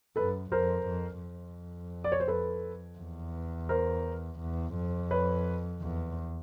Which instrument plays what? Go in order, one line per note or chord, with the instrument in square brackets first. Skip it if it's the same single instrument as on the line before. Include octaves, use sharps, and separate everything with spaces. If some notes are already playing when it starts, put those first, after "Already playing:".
[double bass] F#2 [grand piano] A4 B4
[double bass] F2 [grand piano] A#4 C5
[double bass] F2
F2
[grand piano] D5
C#5
C5
A4 B4
[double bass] E2
[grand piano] A#4 C5
[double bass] E2
F2
[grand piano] B4 C#5
[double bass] E2